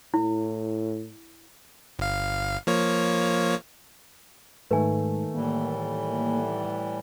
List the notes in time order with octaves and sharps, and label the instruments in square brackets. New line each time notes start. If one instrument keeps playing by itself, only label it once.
[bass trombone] A2 [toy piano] E4
[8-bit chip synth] G1 F5
F3 A#3 C#5
[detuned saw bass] G#2 [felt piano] D#3 A3 [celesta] B4 G#5
[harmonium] A2 E3 G3 [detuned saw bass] A#3